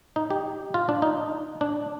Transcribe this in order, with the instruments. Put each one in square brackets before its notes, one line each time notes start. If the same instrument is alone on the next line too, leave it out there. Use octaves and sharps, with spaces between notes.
[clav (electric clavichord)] D#4
G4
F4
D4
D#4
D4